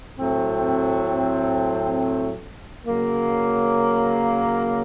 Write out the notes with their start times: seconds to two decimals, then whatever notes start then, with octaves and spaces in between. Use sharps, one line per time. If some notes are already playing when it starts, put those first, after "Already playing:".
0.17 A2 F#3 A3 C4
2.86 C#3 F#3 A#3